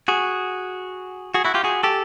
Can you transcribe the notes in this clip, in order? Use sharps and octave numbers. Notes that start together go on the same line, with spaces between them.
F#4 G#4
F#4 G#4
E4 F#4
F4 G4
F#4 G#4
G4 A4